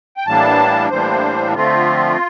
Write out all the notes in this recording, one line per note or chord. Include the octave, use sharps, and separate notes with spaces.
G5
A2 E3 G3 A#3 D4 A5
A2 E3 G3 A#3 D4 C5
D3 F3 A3 C4 F4